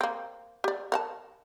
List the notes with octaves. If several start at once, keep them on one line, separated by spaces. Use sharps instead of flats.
A#3 C4
G4 D5
A#4 F#5 A5